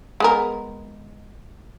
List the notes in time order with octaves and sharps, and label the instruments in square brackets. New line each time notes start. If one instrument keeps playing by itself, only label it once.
[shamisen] G#3 B3 A#4